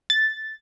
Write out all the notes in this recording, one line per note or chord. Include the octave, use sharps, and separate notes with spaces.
A6